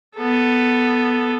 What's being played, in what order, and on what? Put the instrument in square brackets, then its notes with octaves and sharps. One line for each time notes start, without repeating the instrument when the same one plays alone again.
[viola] B3 A4